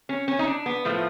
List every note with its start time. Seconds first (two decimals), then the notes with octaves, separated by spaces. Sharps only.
0.09 C#4
0.28 C#4
0.39 D#4
0.47 D4
0.66 B3
0.85 A2 F3 A3